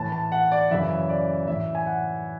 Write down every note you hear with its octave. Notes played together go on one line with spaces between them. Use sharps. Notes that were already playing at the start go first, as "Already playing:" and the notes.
Already playing: A2 E3 A5
A5
F#5
D5
F#2 C#3 E3 E5
D5
A2 E3 E5
G#5
F#5